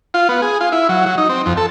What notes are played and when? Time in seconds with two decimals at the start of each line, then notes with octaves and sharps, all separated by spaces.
0.14 F4
0.29 B3
0.42 G#4
0.61 F4
0.72 E4
0.89 F#3
1.06 F#3
1.18 D#4
1.29 C4
1.46 F2
1.57 A4